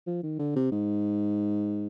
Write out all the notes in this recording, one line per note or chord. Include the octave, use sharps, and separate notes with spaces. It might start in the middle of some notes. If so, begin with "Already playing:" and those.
F3
D#3
D3
C3
G#2